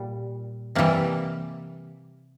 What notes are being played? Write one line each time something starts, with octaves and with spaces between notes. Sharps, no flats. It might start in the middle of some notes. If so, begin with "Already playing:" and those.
Already playing: A#2 G3
C3 E3 G3 A#3